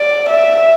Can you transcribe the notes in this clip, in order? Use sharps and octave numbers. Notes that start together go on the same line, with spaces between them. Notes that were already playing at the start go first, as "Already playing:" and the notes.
Already playing: D5
E5